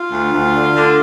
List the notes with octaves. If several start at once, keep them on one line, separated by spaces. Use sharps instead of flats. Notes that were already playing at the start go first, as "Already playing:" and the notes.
Already playing: F4
D2
D2
D3
D3